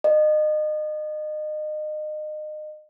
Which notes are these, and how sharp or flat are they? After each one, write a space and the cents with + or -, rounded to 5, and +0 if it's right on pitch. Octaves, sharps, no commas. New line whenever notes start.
D#5 -30